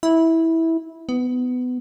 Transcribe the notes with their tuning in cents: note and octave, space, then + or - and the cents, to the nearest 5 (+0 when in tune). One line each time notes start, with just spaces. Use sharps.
E4 -15
B3 +20